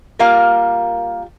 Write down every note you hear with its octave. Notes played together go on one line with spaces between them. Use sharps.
G3 A#3 F4 A#4 F5